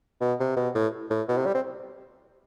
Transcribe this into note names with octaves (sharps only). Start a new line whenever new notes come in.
B2
C3
B2
A2
A2
B2
C3
G3
C4